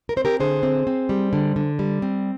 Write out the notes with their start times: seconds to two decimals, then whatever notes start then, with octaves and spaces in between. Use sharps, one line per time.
0.09 A#4
0.16 C4 C5
0.25 G4 A#4
0.40 D3 G#4 C5
0.63 C4
0.87 C4
1.09 G3
1.33 D3
1.56 D3
1.79 G3
2.02 C4